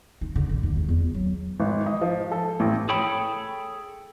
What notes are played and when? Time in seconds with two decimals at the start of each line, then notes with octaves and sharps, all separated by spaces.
0.21 D#4
0.36 D3
0.49 A1
0.63 D#2
0.75 G#3
0.88 E2
1.02 F4
1.14 F#3
1.60 G#1
1.86 D#5
2.01 F3
2.32 A4
2.60 A1
2.89 G#4 A4 C#5 G5 B5